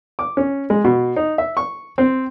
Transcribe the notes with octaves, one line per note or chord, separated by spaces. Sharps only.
D6
C#4
G#3
B2
D#4
E5
C#6
C4